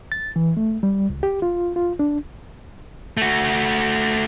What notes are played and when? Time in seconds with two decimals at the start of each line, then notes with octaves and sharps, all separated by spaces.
0.12 A6
0.36 E3
0.57 A3
0.83 G3
1.10 C#2
1.23 G4
1.42 F4
1.76 F4
1.99 D4
3.17 A3 F#4